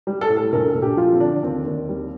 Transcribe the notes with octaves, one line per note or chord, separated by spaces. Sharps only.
G3
A4
A2
A4
A#1 A#4
A4
A#1
G4
F3 F4
C4
D3 D4
D#2 C4
D#2
G3